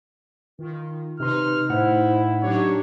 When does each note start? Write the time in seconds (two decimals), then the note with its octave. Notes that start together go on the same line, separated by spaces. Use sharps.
0.59 D#3 F4
1.20 C3 D#4 B4 C6 F6
1.70 A2 E4 C5 F#5
2.43 F#3 D4 D#4 G4 C#5